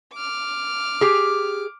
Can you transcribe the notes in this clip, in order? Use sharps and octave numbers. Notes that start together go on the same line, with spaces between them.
D6 F6
G4 G#4